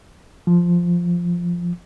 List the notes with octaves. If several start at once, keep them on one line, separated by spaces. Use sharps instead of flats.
F3